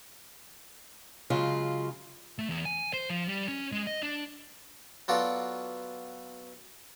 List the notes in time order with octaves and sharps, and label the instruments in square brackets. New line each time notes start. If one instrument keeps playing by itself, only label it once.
[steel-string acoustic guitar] C#3 F#3 G#3 F4
[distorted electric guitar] A3
E2
G#5
C5
F3
G3
C#4
G#3
D#5
D4
[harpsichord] F#3 B3 F4 F#4 A4 D5